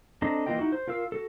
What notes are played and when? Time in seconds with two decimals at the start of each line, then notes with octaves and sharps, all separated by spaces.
0.22 C4 D4 A4 D#5 A#5
0.46 E3 A#3 F4 D#5 G5
0.59 D#4 E4 F#4
0.72 C5
0.88 F4 A#4 F5 E6
1.12 F#4 A4